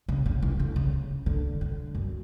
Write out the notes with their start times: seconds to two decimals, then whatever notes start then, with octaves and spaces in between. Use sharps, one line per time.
0.09 C#3
0.26 C#3
0.42 E3
0.59 D3
0.76 C#3
1.26 D3
1.61 D3
1.95 F#2